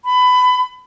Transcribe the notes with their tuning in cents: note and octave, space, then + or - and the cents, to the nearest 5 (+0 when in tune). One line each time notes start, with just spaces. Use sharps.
B5 +20